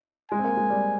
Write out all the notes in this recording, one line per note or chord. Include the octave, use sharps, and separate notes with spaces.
G#3 G#5
C4
A#3
G#3
G3